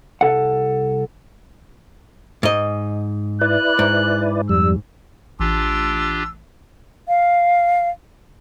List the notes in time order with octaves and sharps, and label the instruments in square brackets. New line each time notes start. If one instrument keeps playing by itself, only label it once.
[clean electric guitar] C2 A4 F#5
[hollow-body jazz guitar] G#2 D#5
[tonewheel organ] E4 B4 D5 [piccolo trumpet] F#6
[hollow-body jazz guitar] G#2
[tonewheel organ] F2 G3 [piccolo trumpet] E6
[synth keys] A1 [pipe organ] D4 F4 G4 [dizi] E6
[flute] F5